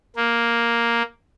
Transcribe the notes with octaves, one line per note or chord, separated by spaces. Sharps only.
A#3